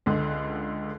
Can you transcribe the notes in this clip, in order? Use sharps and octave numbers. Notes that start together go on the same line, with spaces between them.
C#2 D3